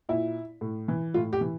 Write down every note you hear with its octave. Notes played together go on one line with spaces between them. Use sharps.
A#2 E4
A2
E3
A2 F4
G4
E3